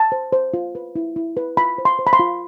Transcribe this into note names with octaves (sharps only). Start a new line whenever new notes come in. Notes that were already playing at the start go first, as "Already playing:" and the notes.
Already playing: A5
C5
C5
F4
B4
E4
E4
B4
F4 B5
C5
C6
C5
B5
C6
F4